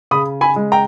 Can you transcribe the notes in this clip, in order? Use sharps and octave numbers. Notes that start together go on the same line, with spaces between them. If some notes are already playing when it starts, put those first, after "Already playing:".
C#3 B5 D#6
G#5 B5
G#3
G5 A#5